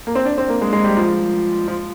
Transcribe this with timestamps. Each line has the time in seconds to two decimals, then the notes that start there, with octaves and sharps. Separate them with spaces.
0.07 A#3
0.15 C4
0.25 D4
0.38 C4
0.49 A#3
0.62 G#3
0.73 G#3
0.84 G3
0.97 F3
1.68 F3